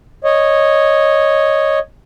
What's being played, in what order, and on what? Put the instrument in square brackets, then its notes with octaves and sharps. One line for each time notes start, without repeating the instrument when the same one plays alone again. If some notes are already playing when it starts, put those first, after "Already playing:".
[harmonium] C#5 D#5